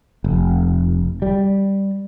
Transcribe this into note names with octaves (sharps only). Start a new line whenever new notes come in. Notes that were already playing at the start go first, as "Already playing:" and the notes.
F1
G3